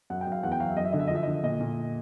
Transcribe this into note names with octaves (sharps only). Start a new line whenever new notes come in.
F#2 F#5
G5
F#2
F5
E2 F#5
G5
F#3 F5
E5
F#2 D#5
E5
D3 D#5
E5
D#5
F3 E5
D3 D#5
A#2 D#5
A#2